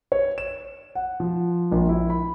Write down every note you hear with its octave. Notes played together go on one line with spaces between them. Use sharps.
C#5
E7
F#5
F3
A#1
E4
B5